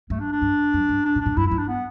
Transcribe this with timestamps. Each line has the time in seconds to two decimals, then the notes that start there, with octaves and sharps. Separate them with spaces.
0.10 G2 A3
0.20 D4
0.32 D4
0.42 G2
0.74 F#2
0.89 G2
1.05 D4
1.15 A2
1.21 D4
1.26 A2
1.36 G2 E4
1.44 F#2
1.46 G2 E4
1.58 D4
1.68 B3